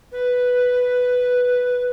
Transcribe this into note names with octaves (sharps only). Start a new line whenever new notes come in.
B4